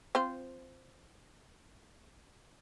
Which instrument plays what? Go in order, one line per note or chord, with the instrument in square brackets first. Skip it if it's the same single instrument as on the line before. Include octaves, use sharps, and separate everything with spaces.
[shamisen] C4 F4 C5